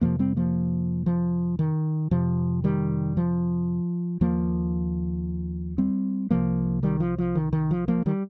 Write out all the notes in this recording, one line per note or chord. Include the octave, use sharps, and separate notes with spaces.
F2 C3 F3 A#3
G3 C4
F3 A#3
F3
D#3
F2 C3 F3
D#3 G3
F3
D#2 F3 A#3
G3 C4
C2 C3 F3 A#3
D#3 G3
F3
F3
D#3
D#3
F3
F3 A#3
D#3 G3